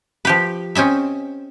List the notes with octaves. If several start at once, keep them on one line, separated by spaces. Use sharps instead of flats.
F3 G4 B4
C4 C#4 D#5 E5